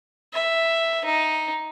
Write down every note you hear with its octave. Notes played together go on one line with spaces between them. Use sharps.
E5
D#4